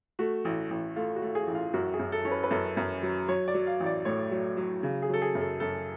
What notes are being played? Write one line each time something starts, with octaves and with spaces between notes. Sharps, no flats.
A3 F#4
A1
A1
A3 F4
F#4
A3
G#4
A1
F4
F#2 F#4
G#4
F#2
A4
C#4
B4
B4
F#2 A4
F#2
F#3
F#3 C#5
D5
F#3
F5
A1
D5
A2 C#5
F#3
F#3
C#3
G#4
F#3 A4
G#4
F#2
A4
F#2 A4